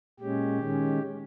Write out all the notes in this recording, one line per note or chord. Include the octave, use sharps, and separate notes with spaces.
A#2 G#3 C#4 G4
D#3 G#3 C#4